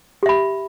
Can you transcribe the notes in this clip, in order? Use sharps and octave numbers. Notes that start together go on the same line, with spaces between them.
G4 E5 B5